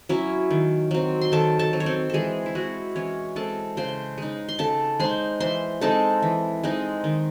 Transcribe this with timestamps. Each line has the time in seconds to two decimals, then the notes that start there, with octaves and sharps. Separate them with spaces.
0.09 F#3 C#4 E4
0.51 D#3
0.91 F#3 C4
1.21 C6
1.32 D#3 A4 A5
1.59 A4 A5
1.73 F#3 C4
1.80 C#5
1.86 C4 C5
2.10 E3 G#3 G#4 A4
2.46 E4
2.55 G#3 C4 F#4
2.96 E3 C#4 C#5
3.36 G#3 C4 A4 A5
3.77 C#3 C5 C6
4.18 G#3 D#4
4.49 C6
4.58 C#3 A4 A5
4.99 G#3 D#4 C5 C6
5.40 E3 C5 C6
5.81 G#3 C4 D#4 A4 A5
6.22 E3
6.64 G#3 C4 D#4
7.04 D#3